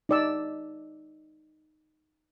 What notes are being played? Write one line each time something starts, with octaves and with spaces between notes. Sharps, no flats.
D#4 D5 E6